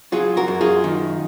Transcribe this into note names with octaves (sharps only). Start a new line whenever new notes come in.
F#3 F4 G#4
F#4 A#4
F#2
F4 G#4
D#3